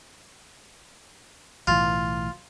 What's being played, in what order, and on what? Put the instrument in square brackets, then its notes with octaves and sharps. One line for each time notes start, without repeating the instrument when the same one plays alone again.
[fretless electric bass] B1 A2 E3 [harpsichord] F4